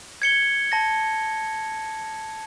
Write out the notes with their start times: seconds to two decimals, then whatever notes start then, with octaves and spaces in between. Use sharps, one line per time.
0.22 G#6 C#7 G7
0.72 A5 A#6